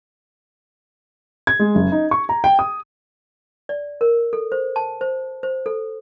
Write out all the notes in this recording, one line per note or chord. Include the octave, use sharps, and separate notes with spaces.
G#6
G#3
F#1
D#4
C#6
A#5
G5
D#6
D5
A#4
A4
C5
A5
C5
C5
A4